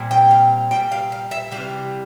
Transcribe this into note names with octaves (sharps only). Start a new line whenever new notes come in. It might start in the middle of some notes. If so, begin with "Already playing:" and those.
Already playing: A#2 G3 C4
G5
F5
A#2 G3 G5
F5
F5
E5
C3 E3 G3 F5